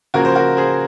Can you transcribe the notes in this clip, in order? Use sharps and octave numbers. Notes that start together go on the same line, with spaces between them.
C#3 F3 A#3 C#4 F#4 A#4
C5
F#4 A#4
G#4 C5